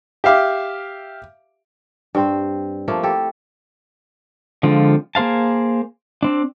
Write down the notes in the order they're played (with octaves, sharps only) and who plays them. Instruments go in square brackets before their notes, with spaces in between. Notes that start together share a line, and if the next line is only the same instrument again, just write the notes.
[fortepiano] G4 E5 F5 D6
[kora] G2 C4 C5
F3 A3 A#3
E4 G4 A4
[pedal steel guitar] D3 F3 G#3 C4 F4
A#3 G#4 C5 F5 A5
C4 D4